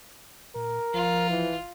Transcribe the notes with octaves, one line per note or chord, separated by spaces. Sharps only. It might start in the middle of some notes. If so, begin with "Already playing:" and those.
A#2 A#4
G#1 F3 F4
G1 E3